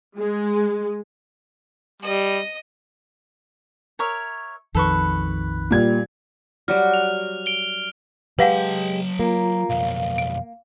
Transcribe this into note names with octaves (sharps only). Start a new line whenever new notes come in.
G#3
G3 D#5
A#4 C#5 E5
A#1 F2 D#3 A4 B4 C#6
A#2 G3 G#6
F#3 G3 F#4 F6
F7
D7 G7
F#3 G#3 G4 B4 F5 F#5 A5
A#3 F4 A#5
B1 F2 F5
D7